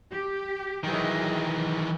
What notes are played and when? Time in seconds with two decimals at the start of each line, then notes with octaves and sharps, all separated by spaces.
0.10 G4
0.83 D#3 E3 F#3 G#4 D#5